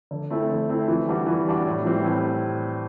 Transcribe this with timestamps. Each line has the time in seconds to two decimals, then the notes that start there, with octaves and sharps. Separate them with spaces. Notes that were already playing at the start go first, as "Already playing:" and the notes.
0.11 D3
0.30 A3 C4 E4 A4
0.50 D3
0.69 A3 C4 E4 A4
0.88 E3
1.08 G3 D4 F#4
1.26 E3
1.47 G3 D4 F#4
1.65 A2
1.85 E3 G3 C4
2.04 A2